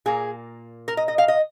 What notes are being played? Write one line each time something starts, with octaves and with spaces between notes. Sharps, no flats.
A#2 A#3 G#4
A#4
D#5
D#5
F5
D#5